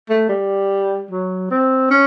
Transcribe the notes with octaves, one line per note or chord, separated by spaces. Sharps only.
A3
G3
F#3
C4
C#4